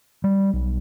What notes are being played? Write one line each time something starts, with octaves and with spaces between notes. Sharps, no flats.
G3
B1